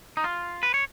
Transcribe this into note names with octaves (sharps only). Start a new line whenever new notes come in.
D#4
F4
B4
C#5